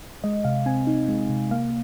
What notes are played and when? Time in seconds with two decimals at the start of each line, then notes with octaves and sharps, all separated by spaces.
0.24 G#3 D#5
0.44 C3 F5
0.66 C4 G#5
0.87 D#4
1.09 G#3
1.30 C3
1.51 A#3 F5